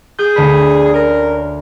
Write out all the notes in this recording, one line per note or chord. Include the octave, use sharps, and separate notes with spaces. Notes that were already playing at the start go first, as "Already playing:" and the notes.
G#4 G6
D2 D3 B4
C#4 A#4